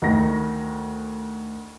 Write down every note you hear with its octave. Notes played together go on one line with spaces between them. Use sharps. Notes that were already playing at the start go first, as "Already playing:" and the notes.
D2 D#3 E4 A#4 A#6